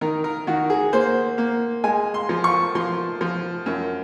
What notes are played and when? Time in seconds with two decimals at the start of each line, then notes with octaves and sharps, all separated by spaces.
0.01 D#3 A#4
0.24 A#4
0.47 D#3 F#4
0.70 G#4
0.93 A#3 C5
1.38 A#3
1.84 G#3 G#5
2.14 C6
2.29 F3
2.44 C#6
2.75 F3 C6
3.21 F3
3.66 F#2